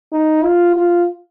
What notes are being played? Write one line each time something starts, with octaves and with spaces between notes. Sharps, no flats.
D#4
F4
F4